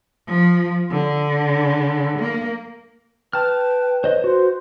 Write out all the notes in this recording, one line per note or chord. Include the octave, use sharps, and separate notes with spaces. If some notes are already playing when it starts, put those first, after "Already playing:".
F3
D3
A#3
B4 G5 A5 F6
C5 C#5 D#5
F#4 C5